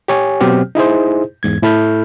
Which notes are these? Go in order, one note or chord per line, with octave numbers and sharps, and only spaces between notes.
G4 C#5 G#5
B2 F#3 C4 G4 F6
D#4 E4 G#4 C5
E2 G#2 G#6
A2 E4 A4 B5 F6 G6